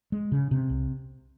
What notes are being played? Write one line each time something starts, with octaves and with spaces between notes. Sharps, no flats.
G#3
C#3
C3
C2